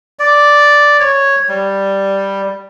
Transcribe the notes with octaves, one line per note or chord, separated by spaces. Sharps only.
D5
C#5
G3